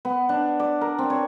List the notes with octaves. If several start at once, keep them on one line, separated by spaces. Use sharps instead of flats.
B3
D4
D5
A#4
C4
C#5